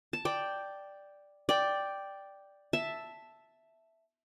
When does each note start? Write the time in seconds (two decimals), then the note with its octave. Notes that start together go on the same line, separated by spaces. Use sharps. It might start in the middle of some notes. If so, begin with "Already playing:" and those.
0.13 A5
0.25 D5 G5
1.49 D5 G5
2.73 E5 A5